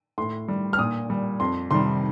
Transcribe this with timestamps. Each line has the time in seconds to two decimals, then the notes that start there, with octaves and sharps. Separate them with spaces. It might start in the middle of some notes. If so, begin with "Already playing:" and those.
0.18 A2 C6
0.48 G3
0.73 F6
0.79 A#2 D#6
1.10 G3
1.40 F2 C6
1.71 C3 D#3 G3 C6